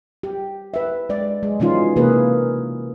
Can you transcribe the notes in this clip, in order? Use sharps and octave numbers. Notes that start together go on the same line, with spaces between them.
G4
B4 E5
G#3 D5
G#3
B2 E3 G#3 C#4 D#4 F4
C3 E3 A#3 G#4 B4